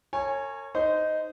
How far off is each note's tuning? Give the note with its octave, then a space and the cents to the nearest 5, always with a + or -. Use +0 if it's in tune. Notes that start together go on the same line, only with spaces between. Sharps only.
A#4 -40 C#5 -15 G#5 +0
D#4 +0 C5 -25